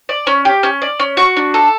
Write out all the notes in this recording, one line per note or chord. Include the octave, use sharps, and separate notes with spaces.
D5
C#4
G4
C#4
D5
C#4
F#4
D4
A4